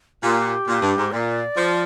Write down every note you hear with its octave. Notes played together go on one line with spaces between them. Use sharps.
A#2 G4
A#2
G2
G#2
A#2 D5
F3